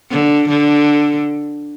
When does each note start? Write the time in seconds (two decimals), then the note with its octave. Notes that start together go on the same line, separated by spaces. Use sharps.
0.11 D3
0.49 D3